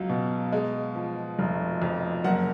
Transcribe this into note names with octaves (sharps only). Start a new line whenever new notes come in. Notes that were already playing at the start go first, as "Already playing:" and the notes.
Already playing: C#2 F#3 F5
B2
G#3
F3
F1
F2
F#1 F#5